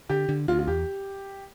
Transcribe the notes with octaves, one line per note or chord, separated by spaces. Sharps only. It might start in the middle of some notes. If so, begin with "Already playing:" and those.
D3 G4
D3
D2 F4
F4
E2 G4